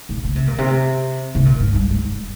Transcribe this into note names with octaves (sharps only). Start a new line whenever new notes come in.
A#2
C#3
C3
A#2
C3
C3
A#2
G#2
G2
G#2